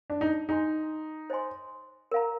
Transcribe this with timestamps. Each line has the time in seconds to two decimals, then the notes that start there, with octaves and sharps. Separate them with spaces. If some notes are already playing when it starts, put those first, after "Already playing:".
0.10 D4
0.21 D#4
0.48 D#4 G#4 D#5 G#5 C6
1.30 C5 D#5 G#5 C6
2.11 A#4 F5 A#5